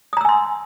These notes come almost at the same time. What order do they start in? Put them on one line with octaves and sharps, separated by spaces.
D#6 A#5 E6 G#5 C6